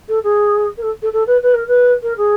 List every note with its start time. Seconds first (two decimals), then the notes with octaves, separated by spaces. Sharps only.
0.08 A4
0.23 G#4
0.77 A#4
0.82 A4
1.02 A4
1.13 A4
1.27 B4
1.42 B4
1.54 A#4
1.67 B4
2.02 A#4
2.17 G#4